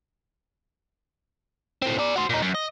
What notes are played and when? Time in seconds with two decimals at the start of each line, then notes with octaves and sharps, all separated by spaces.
1.82 A2 C4
1.99 G#4 D5
2.16 F#4 C5
2.30 A#2 D#4
2.42 F#2
2.55 D#5